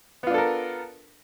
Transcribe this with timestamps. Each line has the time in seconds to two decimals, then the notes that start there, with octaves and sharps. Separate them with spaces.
0.23 B3
0.27 F4
0.30 D4
0.34 A4
0.38 A#4